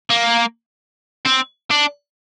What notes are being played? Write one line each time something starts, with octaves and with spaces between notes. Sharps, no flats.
A#3
C4
D4